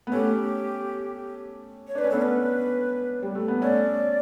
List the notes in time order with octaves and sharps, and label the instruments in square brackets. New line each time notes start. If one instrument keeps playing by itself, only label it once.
[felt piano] B3
[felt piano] A3 C#4 [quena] G4
[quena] C#5
[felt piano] D4 [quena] B4
[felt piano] C#4
[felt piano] B3 D4 [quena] A4
[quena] B4
[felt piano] G3
A3
B3
[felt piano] A3 C#4 [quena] D5